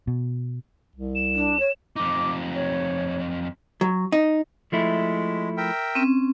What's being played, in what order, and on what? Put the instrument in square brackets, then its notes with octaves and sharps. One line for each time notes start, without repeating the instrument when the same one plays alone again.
[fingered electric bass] B2
[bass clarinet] C2
[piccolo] E7
[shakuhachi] D4
C#5
[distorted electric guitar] F2 D#4 [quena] D6
[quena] C#5
[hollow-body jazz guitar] F#3
D#4
[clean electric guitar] F3 A3 E4 [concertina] G#3
[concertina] A#4 E5 G5
[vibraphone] C4 C#4